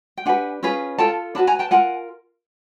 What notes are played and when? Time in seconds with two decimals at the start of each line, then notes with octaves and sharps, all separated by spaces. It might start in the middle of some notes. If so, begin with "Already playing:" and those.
0.17 G5
0.26 D4 G4 B4 F#5 G#5
0.63 C#4 F4 G#4 B4
0.98 F4 A4 G5 A5
1.35 D4 F#4 B4 A5 B5
1.47 G#5 A#5
1.59 G5 A5
1.71 F4 A#4 F#5 G#5